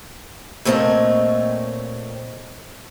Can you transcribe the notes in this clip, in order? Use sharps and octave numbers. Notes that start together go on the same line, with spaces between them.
A#2 A3 C4 C#5 D#5